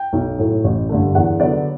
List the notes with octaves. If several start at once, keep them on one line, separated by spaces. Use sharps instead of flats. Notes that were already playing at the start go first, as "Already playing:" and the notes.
Already playing: G5
B1
A2 F#3 A3
A1
G2 D3 A3
E2 F#5
D3 F#3 B3 D5